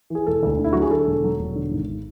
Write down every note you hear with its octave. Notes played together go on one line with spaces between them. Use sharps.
E3 G#4
E1 A4
D2
D3
E4
F#3 F#4
G#4
D3 A4
E1
F#3
E1
D3
G#1